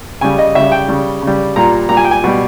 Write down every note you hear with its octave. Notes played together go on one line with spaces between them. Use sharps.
C#3 G3 G#5
D#5
C#3 G3 E5
G5
C#3 G3
C#3 G3
A#2 G3 A#5
A#2 G3 A#5
G#5
G5
G#5
B2 G3